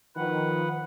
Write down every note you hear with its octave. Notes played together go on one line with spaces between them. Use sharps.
D#3 F3 B4 F#5